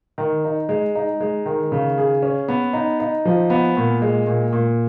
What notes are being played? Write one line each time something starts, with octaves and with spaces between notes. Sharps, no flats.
D#3
D#4
G#3
D#4
G#3
D#3
C#3
G#4
C#4
B3
D#4
D#4
F3
B3
A#2
G#3
A#2
A#2